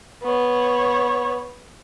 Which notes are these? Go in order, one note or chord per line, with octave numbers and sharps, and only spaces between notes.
B3 C#5